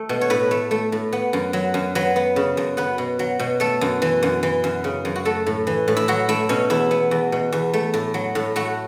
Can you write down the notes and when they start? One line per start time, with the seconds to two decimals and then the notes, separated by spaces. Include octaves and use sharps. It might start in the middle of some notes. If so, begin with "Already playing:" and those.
Already playing: A3
0.09 B2
0.21 C#5
0.30 A2 B4
0.51 A3
0.71 A3
0.92 A2
1.13 B3
1.33 F#2
1.53 F#3
1.74 F#2
1.95 F#3 B4
2.16 B3
2.36 C#3
2.57 F#2
2.77 B3 B4
2.98 B2
3.19 F#3
3.39 B2
3.60 A3 A4
3.81 F#2
4.02 E3
4.23 F#2
4.43 E3
4.64 F#2
4.84 C#3
5.05 F#2
5.16 F#4
5.25 A3 A4
5.47 A2
5.67 E3
5.88 A2
5.97 E4
6.08 F#3 F#4
6.29 A3 E4
6.49 B2 C#4
6.70 E2 E4
6.91 B3
7.11 E2
7.32 B2
7.52 E2
7.73 A3
7.94 A2
8.14 F#3
8.35 A2
8.56 A3 F#4